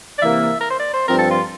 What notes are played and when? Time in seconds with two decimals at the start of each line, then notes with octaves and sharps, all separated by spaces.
0.19 D5
0.22 C3 E3 A#3 E5
0.61 A#4
0.70 C5
0.79 D5
0.94 C5
1.08 G2 F3 C4 A#4
1.19 A4
1.31 F4